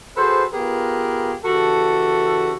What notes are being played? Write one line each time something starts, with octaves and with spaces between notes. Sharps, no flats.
F#4 G#4 A4 B4 C5
B3 F4 G4 G#4 A#4 B4
C#3 E3 F#4 G4 A4